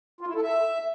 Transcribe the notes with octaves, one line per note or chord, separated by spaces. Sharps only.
F4
E4
A4
E5